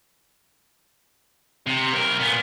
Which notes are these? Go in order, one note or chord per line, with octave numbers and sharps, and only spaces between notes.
C3
B1 A#4
A#2 B3